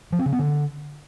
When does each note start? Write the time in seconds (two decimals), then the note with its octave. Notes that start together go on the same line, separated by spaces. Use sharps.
0.12 F3
0.19 C4
0.26 C#3
0.32 B3
0.39 D3